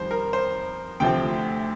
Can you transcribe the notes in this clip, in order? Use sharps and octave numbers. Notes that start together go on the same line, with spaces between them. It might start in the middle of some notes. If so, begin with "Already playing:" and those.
Already playing: F2 D#3 G3 C5
A#4
C5
D2 C3 F3 A3 C4 G5